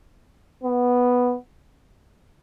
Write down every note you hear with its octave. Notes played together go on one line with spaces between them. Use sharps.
B3